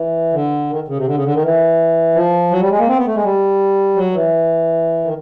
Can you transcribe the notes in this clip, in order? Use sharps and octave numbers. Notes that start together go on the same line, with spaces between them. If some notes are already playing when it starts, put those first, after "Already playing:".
Already playing: E3
D3
D#3
C#3
C3
D3
C#3
D3
D#3
E3
F3
F#3
G3
G#3
A#3
C4
B3
A3
G#3
G3
F#3
E3
D#3